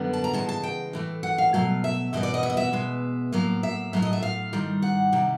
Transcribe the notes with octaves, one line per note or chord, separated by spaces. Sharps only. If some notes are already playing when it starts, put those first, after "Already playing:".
Already playing: F#2 D3 G3 B3
A5
A#5
C#3 E3 G#3 A5
A5
G5
A2 E3 A3
F#5
F5
B2 F#3 A3 F5
E5
E2 B2 G3 B3 D#5
D5
D#5
E5
D#5
E5
B2 G#3 B3
A2 F#3 A#3 F5
E5
A2 F#3 A3 F5
D#5
E5
F5
G#2 D#3 G3
F#5
C3 D#3 G3